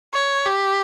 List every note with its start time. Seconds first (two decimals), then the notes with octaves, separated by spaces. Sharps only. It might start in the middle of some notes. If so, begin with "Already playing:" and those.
0.13 C#5
0.46 G4